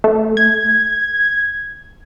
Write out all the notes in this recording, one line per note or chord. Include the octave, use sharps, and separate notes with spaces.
A3
G#6